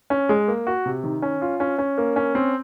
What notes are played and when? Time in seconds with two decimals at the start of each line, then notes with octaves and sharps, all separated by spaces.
0.10 C#4
0.29 G#3
0.48 A#3
0.67 F#4
0.86 C3
1.04 D#3
1.22 C#4
1.42 F4
1.60 C#4
1.78 C#4
1.98 A#3
2.16 C#4
2.35 C4